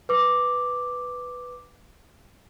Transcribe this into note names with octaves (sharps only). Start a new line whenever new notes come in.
B4 D6